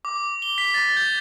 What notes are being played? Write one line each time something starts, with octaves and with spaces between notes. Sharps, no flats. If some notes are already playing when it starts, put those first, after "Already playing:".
D6
G7
B6
A6
G6